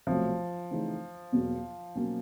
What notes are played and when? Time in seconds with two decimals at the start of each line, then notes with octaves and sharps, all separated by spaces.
0.07 C2 B2 F3 F#3 A3
0.71 C#3 E3 A3 C4 D#4
1.32 E2 B2 F#3 A#3
1.95 B2 F#3 A#3 C#4